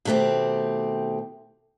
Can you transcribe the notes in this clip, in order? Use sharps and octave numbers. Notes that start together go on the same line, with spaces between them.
B2 D#3 A3 C4 G4